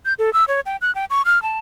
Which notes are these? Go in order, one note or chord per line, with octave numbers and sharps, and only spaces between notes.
G6
A4
E6
C#5
G5
F#6
G5
C#6
F6
A5